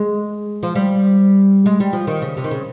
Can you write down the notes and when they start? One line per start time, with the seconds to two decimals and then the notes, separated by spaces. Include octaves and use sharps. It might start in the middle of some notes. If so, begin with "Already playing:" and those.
Already playing: G#3
0.63 F3
0.75 G3
1.66 G#3
1.80 G3
1.93 F3
2.07 D#3
2.22 C#3
2.37 C3
2.44 D#3
2.51 C#3